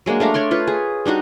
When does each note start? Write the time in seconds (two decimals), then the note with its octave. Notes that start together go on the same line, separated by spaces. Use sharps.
0.06 F#3 G#3 A#3 D4
0.20 A3 D4 F5 A#5
0.34 D4 C#5 D5 C6
0.51 F4 B4 C#5
0.67 G#4
1.06 G3 D4 D#4 F#4